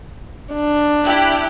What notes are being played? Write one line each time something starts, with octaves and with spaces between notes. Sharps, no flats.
D4
E4 G4 F#6